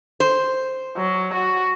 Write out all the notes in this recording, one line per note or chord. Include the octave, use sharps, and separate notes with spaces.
C5
F#3
F#4